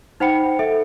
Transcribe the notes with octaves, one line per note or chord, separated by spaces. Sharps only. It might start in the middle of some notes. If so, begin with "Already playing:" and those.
D#4 C5 F#5 G5 B5 C#7
A4 E5